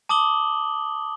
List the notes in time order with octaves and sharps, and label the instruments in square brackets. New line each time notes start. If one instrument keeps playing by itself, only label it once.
[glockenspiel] A5 D6 D#6 F#7 G7